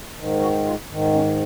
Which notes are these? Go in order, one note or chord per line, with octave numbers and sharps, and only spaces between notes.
G#2 D#3
F#4
F4
G#2 D#3
C#4